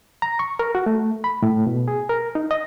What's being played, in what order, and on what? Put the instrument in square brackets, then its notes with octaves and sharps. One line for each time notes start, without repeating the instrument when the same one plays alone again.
[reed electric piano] A#5
C#6
A#4
F#4
A3
B5
A2
B2
G#4
A#4
D#4
D#5